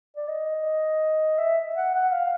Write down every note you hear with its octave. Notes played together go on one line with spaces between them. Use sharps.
D5
D#5
E5
F#5
F#5
F5